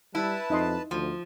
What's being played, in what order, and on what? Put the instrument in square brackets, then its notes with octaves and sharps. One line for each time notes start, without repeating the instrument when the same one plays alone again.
[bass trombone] G3 [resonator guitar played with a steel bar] E4 [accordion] B4 A5
[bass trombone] F2 [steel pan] D#4 D#5 C6
[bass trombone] D2 [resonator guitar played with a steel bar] F3